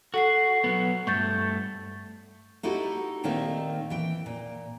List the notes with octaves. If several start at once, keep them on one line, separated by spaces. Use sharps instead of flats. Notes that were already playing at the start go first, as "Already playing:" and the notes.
F#4 A4 F#5 C7
F#3 B3
G2 A3 C#6 G6 A6
D#4 E4 F#4 G4 A4
A#2 D#3 A3 A#3 C4 D#4
E3 G5
A#2